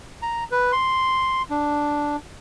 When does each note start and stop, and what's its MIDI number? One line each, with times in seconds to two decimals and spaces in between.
0.22 0.44 82
0.51 0.72 71
0.72 1.42 84
1.50 2.16 62